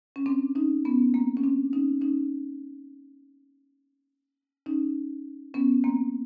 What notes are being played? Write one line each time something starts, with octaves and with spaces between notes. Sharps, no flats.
C#4
C4 D4
C#4 D#4
B3 C#4
A#3 C4
C#4
C4 D4
C#4 D#4
C#4 D#4
C#4 D#4
B3 C#4
A#3 C4